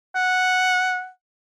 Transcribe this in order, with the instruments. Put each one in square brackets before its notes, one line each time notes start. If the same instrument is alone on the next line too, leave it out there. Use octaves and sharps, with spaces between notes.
[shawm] F#5